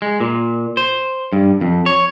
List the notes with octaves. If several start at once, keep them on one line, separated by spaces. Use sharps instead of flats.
G#3
A#2
C5
G2
F2
C#5